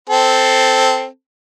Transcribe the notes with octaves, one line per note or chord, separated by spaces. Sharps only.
C4 A4